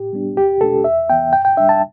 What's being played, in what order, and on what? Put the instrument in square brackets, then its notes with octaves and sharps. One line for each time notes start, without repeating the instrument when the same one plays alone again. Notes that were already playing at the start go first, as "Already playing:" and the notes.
Already playing: [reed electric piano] A2 G4
G3 B3 D4
E2 G4
B2 A3 D4 A4
E2 E5
E3 B3 G5
G2 G5
G5
G3 D4 E5
A5